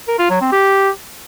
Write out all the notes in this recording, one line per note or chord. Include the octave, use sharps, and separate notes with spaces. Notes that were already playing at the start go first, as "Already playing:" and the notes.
A#4
F4
F#3
C4
G4